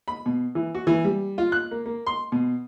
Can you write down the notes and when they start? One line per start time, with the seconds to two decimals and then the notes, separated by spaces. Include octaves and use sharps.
0.08 B5
0.26 B2
0.55 E3
0.74 F#4
0.87 E3
1.05 G3
1.38 F4
1.52 F#6
1.71 A#3
1.86 A#3
2.07 C6
2.32 B2